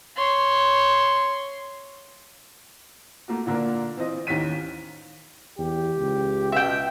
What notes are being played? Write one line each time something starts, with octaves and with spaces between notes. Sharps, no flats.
C#5 C6
A3 A#3 F4 F#4
A#2 D3 A#3 D4 A#4
E3 C4 F4 D#5
A1 D#2 D#3 C#4 B6 D#7
E2 G4
C#2
B2 E5 G5